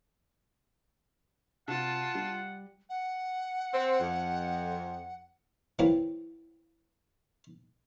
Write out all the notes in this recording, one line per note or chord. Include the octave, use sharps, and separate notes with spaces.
C3 F4 F#5 A5
G3
F#5
C4
F2
E3 F#3 A#3 C4 F4